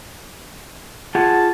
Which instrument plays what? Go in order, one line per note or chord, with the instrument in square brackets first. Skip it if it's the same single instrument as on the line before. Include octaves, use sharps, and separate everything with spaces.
[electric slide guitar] F4 G#4 F#5 [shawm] A5